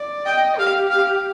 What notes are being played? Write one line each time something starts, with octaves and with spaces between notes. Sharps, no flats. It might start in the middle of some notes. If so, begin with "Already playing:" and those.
Already playing: D5
D#5 G5
G4 F5
F5